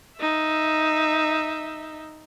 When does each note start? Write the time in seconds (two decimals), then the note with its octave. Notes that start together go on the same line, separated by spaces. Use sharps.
0.18 D#4 E5